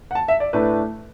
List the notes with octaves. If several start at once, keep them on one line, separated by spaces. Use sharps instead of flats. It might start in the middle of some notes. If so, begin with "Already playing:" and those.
F#5
A5
E5
D5
A2 A3 D4 B4